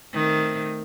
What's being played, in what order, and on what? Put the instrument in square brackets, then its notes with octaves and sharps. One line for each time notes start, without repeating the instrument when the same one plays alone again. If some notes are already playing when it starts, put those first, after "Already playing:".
[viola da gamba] D#3 A3 C4